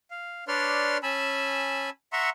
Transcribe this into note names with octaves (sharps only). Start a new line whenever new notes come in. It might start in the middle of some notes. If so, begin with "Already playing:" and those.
F5
D4 B4 C#5 D5 C6 F6
C#4 G#5 A5 B5 E6
E5 F#5 A#5 C6 C#6 E6